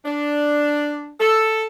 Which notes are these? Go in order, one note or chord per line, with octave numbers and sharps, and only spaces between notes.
D4
A4